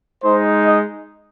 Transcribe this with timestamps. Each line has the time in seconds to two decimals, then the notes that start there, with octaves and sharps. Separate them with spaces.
0.22 G#3 D#4 C5
0.65 D#5